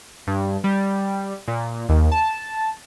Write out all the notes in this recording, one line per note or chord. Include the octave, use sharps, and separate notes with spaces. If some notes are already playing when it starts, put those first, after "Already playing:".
G2
G3
A#2
D#2
A5